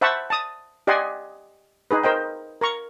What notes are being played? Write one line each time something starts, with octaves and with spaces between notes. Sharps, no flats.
C5 E5 F#5 A5 B5 C#6
A5 D#6
G4 D5 D#5 F#5 G#5 C6
D#4 G#4 B4
A#4 C5 D#5 G5
A#4 A#5 C#6